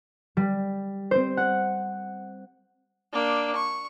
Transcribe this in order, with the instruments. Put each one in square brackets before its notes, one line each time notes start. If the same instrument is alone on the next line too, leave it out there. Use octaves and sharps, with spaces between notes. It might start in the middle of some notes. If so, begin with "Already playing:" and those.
[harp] G3
C4 C5
F#5
[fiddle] A#3 D4
C#6